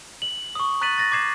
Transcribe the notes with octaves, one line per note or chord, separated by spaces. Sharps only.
F#7
C#6 D#6
A#5 F#6 A6 B6 D#7 F#7
A6 A#6
D6 G#6 C7 E7